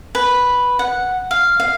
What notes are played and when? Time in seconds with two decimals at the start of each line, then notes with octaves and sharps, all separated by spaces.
0.15 B4
0.79 F#5
1.31 F5
1.60 F5